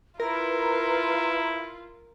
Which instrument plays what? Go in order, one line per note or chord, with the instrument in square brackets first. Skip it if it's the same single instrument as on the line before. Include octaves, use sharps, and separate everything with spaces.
[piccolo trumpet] E4 [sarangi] F4 [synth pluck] A#4 [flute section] B4 A#5